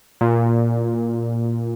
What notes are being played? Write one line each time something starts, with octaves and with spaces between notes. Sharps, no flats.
A#2